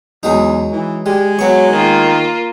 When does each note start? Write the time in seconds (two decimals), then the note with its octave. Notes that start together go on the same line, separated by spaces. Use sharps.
0.23 E2 F#3 G#3 D#4
0.72 E3
1.06 G3 G#3
1.39 F#3 B3 C#6
1.70 D#3 A#3 F4